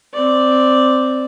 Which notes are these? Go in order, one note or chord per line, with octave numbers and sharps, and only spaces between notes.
C4 D5